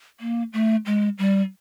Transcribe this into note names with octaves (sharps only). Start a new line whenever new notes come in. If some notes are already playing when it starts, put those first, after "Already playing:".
A#3
A3
G#3
G3